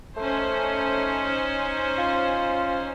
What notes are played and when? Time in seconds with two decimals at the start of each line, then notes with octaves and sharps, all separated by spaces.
0.17 A3 C#4 D#4 C5
1.98 F4